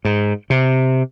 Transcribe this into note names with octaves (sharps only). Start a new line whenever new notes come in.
G#2
C3